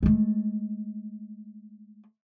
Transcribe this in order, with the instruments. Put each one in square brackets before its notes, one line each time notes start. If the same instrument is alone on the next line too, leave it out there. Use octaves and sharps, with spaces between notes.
[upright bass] G#3 A3